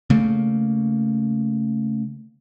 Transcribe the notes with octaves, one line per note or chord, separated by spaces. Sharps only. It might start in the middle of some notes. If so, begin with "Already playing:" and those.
C#3 A3 A#3